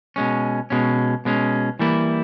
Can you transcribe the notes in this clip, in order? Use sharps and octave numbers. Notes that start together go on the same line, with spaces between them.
B2 G#3 C#4
B2 G#3 C#4
B2 G#3 C#4
E3 G3 A#3 E4